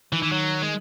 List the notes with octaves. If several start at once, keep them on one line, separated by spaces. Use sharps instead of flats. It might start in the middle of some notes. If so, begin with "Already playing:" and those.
D#3 E3
E3
F#3
G#3